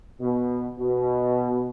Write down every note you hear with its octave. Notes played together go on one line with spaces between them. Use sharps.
B2
B2